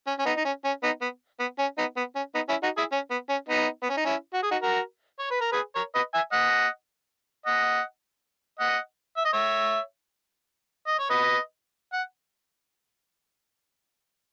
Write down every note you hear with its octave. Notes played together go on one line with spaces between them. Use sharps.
C#4
C#4
B3 D#4
D#4
C#4
C#4
B3 D#4
B3
B3
C#4
B3 D#4
B3
C#4
B3 D#4
C#4 E4
D#4 F#4
E4 G#4
C#4
B3
C#4
B3 D#4
B3
C#4
D#4
C#4 E4
F#4
G#4
D#4 F#4
F#4 A#4
C#5
B4
A#4
G#4 B4
A#4 C#5
B4 D#5
E5 G#5
D#5 F#5
D#5 F#5
D#5 F#5
E5
D#5
C#5 E5
D#5
C#5
B4 D#5
F#5